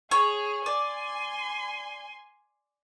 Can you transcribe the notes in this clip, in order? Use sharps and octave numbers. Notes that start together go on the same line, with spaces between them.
G#4 C#5
D5 G#5 C6